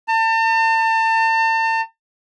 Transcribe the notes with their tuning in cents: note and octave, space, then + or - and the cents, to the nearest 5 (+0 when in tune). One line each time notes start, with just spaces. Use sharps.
A5 +40